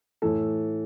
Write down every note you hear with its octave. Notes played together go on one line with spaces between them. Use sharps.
A2 E3 A4